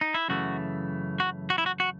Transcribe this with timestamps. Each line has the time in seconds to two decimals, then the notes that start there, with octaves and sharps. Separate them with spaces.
0.01 D#4
0.14 E4
0.28 F#2 C#3 E3 A3 F#4
1.20 F#4
1.50 F#4
1.58 E4
1.66 F#4
1.80 F#4